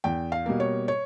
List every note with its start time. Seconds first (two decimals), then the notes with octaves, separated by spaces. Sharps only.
0.04 E2 G5
0.32 F5
0.46 B2 G3 A#3
0.60 C#5
0.88 C#5